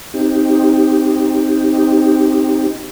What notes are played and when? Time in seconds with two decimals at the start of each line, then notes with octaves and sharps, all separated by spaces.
0.14 C4 D#4 G4